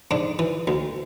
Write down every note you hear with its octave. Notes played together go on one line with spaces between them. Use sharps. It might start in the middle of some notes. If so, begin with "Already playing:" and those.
G#2 D4
E3
D2